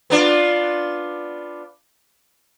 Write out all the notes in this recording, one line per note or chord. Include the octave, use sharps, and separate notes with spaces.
B3 D4 F4